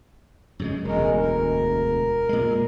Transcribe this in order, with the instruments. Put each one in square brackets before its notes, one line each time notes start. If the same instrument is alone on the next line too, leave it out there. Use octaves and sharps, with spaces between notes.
[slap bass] F#2 C#3 G#3
[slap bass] E1 D2 [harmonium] G#3 A#4
[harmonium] A#4
[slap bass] A#2 G#3